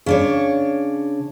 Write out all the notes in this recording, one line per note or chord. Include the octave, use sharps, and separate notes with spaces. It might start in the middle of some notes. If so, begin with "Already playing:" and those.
C#3 D4 C#5